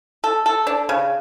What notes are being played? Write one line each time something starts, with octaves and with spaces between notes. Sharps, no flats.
A4
A4
D4
C#3